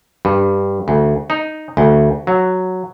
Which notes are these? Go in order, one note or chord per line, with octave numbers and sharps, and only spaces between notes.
G2
D2
D#4
D2
F#3